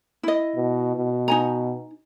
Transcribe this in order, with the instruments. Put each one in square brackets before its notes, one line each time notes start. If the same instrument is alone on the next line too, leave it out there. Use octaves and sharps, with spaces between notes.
[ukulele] E4 D#5
[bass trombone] B2
B2
[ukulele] D#4 G#5 A#5